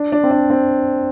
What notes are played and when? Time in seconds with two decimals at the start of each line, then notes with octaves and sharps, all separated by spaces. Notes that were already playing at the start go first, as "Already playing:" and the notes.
Already playing: D4
0.12 D4
0.24 C4
0.31 D4
0.50 C4